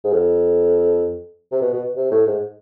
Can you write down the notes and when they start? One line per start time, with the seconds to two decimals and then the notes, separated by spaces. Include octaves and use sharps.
0.04 G#2
0.13 F2
1.52 C3
1.62 B2
1.73 B2
1.96 C3
2.11 A2
2.26 G#2